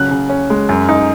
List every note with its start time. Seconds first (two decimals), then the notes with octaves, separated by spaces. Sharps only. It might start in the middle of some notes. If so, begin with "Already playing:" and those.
Already playing: C#3 F#3 F#6
0.11 C#3
0.29 C#4
0.50 G#3
0.69 F#2
0.89 D#4